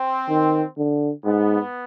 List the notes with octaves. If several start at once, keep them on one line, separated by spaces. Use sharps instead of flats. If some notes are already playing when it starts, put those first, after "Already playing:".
Already playing: C4
D#3
D3
G#2 B3